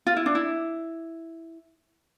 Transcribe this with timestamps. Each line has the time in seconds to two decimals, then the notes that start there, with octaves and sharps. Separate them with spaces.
0.07 F4
0.17 E4
0.26 D4
0.35 E4